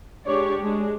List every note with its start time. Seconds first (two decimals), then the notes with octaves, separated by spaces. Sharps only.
0.25 G#3 D4 G4 C#5 D5
0.60 G#3 D4